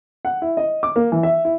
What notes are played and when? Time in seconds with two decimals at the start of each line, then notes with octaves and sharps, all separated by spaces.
0.25 F#5
0.42 E4
0.57 D#5
0.83 D6
0.96 A#3
1.12 E3
1.23 E5
1.45 E4